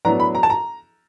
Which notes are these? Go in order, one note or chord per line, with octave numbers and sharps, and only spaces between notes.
A2 F#3 B3 D4 A#5
B5
A#5
A5
A#5